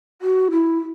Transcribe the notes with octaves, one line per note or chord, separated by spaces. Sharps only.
F#4
E4